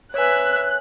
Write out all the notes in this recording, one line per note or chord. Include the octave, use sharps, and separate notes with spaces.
B4 C#5 E5 G#5 F#6